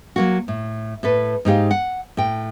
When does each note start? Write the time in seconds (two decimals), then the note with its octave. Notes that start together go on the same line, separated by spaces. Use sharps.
0.16 F#3 A#3 F#4
0.48 A2
1.03 A2 A4 B4
1.45 G#2 D#4 G4 F5
1.71 F#5
2.17 A2 G5